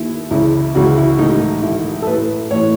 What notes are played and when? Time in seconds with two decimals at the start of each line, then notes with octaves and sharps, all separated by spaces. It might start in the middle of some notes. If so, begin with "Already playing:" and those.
Already playing: D#2 D#3 E4
0.31 C#2 C#3 E3 E4
0.75 C#2 C#3 E3 F#4
0.97 E4
1.18 A1 G#2 D#3 D#4
1.62 A1 G#2 D#3 E4
2.02 A4
2.07 A1 A2 E3 B4
2.50 A1 A2 E3 C#5